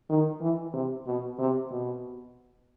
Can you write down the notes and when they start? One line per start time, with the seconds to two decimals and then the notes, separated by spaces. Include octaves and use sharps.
0.09 D#3
0.41 E3
0.73 C3
1.06 B2
1.38 C3
1.70 B2